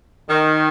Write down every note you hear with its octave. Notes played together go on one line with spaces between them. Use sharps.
D#3